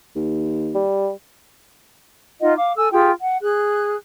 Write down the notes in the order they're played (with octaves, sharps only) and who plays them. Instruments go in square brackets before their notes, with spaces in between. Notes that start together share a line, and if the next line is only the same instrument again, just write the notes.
[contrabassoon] D#2
[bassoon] G3
[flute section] D#4 F4 D#5 F#5
F5 D6
A4 G#5 E6
F4 G4 G#4 G5
F#5
G#4 F#6